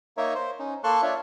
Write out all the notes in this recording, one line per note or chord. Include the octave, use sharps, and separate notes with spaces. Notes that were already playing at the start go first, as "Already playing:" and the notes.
A#3 D#4 A#4 C#5 E5
C5
C#4 D#4
A#3 A4 A5 C6 C#6 F#6
D4 F4 C#5 E5